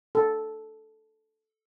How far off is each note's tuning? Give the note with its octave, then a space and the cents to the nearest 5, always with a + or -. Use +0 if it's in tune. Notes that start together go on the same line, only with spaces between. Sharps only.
A4 -5